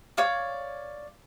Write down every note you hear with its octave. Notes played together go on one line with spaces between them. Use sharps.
C#5 D5 F5 D6